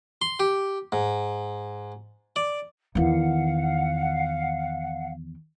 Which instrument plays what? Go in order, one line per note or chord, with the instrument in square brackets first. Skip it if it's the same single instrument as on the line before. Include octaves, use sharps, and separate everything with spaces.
[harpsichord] C6
G4
G#2
D5
[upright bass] E2 D#3 [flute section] F5 F#5